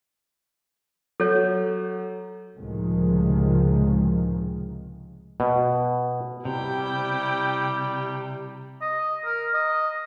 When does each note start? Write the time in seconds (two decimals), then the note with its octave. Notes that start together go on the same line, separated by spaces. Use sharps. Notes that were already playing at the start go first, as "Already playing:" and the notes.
1.20 F#3 A4 C#5
2.58 C#2 A2 C3 D#3 F3 G#3
5.40 B2
6.45 C3 G3 E4 G5
8.82 D#5
9.25 A#4
9.54 D#5